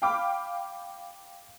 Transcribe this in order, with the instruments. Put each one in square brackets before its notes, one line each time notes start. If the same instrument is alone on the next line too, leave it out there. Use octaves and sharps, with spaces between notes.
[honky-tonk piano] F5 G5 B5 D6 F6